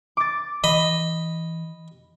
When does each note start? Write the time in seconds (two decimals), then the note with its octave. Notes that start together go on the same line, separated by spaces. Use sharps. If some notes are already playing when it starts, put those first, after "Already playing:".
0.17 D6 A6
0.64 E3 D#5 B5